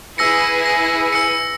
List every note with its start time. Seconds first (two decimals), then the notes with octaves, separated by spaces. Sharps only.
0.18 E4 G#4 B4 E6 A#6 C#7
0.65 A#6
1.12 E6 C#7